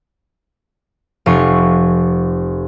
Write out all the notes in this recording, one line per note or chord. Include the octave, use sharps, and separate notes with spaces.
F1 F4 C#6